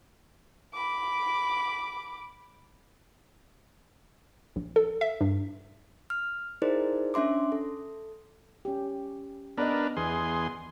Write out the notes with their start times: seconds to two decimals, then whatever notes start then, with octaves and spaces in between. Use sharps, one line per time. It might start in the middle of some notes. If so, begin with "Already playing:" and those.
0.74 B5 D6
4.56 A#1
4.76 A4
5.01 E5
5.21 G2
6.10 F6
6.62 D#4 E4 G#4 A#4 C5 D5
7.14 C#4 D4 E5 C6 D6
7.52 A4
8.65 C#4 G4
9.58 B3 D4 A#4 B4 D5 D#5
9.97 E2 G#4 C6